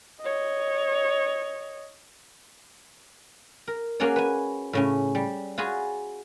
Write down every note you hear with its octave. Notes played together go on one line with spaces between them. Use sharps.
C#5 D#5
A#4
A#3 C#4 F#4 G#4 C#5 D5
B4 G#5
A2 C#3 C#4
G3
F4 F#4 G#4 G#5 B5